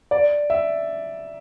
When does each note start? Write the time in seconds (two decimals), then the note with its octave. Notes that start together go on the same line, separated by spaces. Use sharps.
0.11 D5
0.50 E5